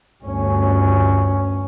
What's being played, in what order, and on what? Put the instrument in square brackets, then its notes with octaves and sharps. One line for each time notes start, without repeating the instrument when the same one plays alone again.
[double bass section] G1 D2 C#4